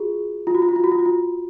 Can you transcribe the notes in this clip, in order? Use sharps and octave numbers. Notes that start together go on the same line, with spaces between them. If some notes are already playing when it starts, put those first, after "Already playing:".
Already playing: F4 F#4 G#4
F4
F#4
F4
F#4
F4
F#4
F4
F#4
F4